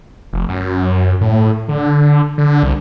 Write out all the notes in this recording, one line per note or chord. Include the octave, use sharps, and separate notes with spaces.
F1
F#2
A2
D3
D3
C2